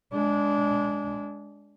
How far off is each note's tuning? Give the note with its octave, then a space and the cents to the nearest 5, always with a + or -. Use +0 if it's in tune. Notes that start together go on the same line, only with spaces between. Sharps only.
G#3 +0 D4 -20